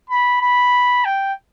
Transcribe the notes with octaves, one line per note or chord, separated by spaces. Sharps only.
B5
B5
G5